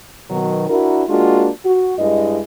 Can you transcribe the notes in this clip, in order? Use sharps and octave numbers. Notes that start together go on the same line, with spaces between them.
B2 D#3 F#3
D4 E4 F#4 A#4
G#3 A#3 D4 F4 F#4
F#4
G2 G#3 E4 D#5